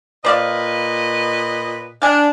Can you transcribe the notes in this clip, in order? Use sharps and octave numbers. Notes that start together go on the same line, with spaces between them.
A#2 B4 C5 D5 D#5 F5
D4 F5 G#5